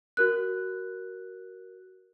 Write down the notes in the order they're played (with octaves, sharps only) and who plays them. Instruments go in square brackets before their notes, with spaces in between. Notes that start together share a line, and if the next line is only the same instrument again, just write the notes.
[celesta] F#4 A#4 F#6